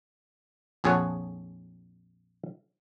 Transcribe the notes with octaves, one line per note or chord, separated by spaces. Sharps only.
A#1 F2 G#4 A4 C#5 F#5